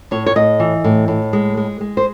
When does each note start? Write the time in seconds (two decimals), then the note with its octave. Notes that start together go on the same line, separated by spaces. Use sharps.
0.11 A2 C#5
0.26 C#5
0.36 A2 D#5
0.60 E3
0.84 A2
1.08 A2
1.33 G#3
1.57 G#3
1.81 G#3
1.97 C5